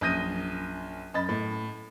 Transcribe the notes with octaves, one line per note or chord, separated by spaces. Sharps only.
A#1 F#2 D#6 G6 A#6 D#7
F#2 D#5 B5 A6
A2